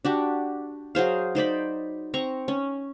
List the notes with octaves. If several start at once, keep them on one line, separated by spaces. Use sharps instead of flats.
D4 F#4 G4
F#3 G#4 C5 F5
D#4 C5 D5 B5
C4 A#5 C#6
C#4